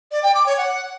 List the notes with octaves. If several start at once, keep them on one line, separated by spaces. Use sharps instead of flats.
D5
G5
D6
C#5
F#5